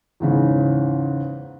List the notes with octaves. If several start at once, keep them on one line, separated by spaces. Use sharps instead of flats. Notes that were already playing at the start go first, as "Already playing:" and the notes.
E2 G#2 C#3